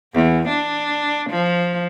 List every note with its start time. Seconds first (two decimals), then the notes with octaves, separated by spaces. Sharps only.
0.14 E2
0.48 D4
1.31 F3